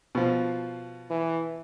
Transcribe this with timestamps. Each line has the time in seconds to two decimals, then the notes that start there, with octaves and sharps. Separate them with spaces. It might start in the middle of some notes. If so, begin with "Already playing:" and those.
0.15 B2 F3
1.10 E3